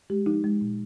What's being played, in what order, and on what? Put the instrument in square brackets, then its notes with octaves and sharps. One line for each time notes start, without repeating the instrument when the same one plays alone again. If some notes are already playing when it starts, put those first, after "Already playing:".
[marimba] G#3 G4
F3 D#4
G#3
A#2